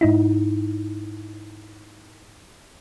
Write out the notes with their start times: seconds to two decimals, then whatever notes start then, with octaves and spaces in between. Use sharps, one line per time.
0.01 G#2 D#4 E4